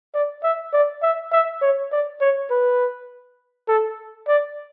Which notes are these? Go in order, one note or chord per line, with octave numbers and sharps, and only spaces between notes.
D5
E5
D5
E5
E5
C#5
D5
C#5
B4
A4
D5